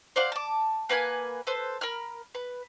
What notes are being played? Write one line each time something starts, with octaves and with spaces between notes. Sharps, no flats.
C5 D5 F5 F#5
A5 D6
A#3 B4 F#5 G#5
A4 B4 C5
A#4 B5 F6
B4